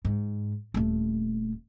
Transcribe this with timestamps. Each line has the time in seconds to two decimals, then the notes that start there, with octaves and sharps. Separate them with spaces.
0.05 G#2
0.74 D#1 A3